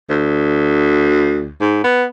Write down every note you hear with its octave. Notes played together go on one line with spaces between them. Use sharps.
D2
G#2
B3